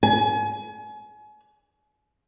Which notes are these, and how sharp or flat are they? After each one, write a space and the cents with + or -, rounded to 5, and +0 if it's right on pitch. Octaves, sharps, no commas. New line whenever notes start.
G#5 +35